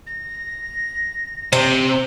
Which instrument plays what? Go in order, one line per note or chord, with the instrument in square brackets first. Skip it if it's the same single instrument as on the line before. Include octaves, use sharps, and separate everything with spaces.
[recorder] A#6
[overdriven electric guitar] C3 [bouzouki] C5